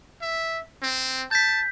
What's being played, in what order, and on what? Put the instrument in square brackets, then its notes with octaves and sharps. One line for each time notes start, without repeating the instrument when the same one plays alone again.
[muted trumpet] E5
C4
[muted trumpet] A5 [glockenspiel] G6 B6